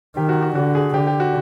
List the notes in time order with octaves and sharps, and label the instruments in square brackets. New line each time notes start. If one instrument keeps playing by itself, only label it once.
[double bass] D#3 [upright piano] G4
[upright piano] F#4
F#4
[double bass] D3 [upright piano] F#4
[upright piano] G#4
[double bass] D3 [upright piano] G4
[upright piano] G4
F#4